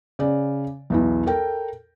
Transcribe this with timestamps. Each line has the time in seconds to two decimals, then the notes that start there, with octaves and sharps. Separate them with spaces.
0.19 C#3 D5
0.90 B1 E2 E4
1.26 A4 A#4 G5